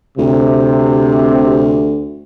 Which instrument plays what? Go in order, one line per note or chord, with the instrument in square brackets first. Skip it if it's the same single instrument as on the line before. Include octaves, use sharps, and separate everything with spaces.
[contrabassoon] D2 [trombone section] C3